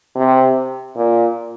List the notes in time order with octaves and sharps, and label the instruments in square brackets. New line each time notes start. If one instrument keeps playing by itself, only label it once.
[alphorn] C3
A#2